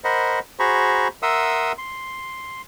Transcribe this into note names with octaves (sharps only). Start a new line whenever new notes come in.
A#4 C5 D#5 F#5 B5
F#4 G#4 C5 A#5 B5 C#6
A#4 E5 F#5 C6 D#6 E6
C6